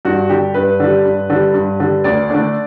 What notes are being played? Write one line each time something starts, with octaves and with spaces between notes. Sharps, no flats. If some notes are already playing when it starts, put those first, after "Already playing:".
G2 F#4
D3 G3 G4
G2 B4
D3 G3
G2
D3 G3
G2
D3 G3
D2 D5
D3 A3 D4